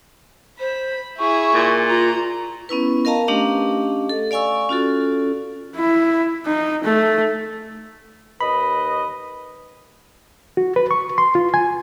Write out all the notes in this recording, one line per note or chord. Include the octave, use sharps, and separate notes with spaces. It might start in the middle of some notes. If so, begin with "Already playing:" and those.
C5 B5
E4 G#4 C#6
A#2
F4 A#5
B3 C#4 E4 B4
A#4 D#5 F5 A5 A#5
A3 C#4 D4 G4 D#5 F5
A4
D5 F5 G#5 C#6 E6
C#4 F4 F#4 A4
E4
D#4
A3
D#2 B4 D#5 B5
F#4
B4
C#6
C6
F4
G#5